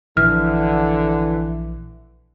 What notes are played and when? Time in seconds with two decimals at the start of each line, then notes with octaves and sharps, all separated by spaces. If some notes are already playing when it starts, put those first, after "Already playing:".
0.17 A#1 D3 E3 F6